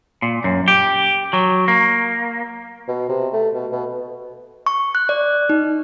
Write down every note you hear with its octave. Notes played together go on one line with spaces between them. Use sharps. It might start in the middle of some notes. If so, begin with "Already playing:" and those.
A#2
F#2
G4
F#3
A#3
B2
C3
A3
B2
B2
C#6
F#6
D5
D#4